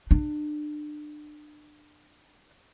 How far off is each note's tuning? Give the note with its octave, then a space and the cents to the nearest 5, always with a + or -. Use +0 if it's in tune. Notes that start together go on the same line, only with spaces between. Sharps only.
D4 +30